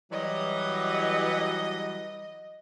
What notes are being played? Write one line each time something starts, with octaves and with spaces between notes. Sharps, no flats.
E3 F#3 G3 D#5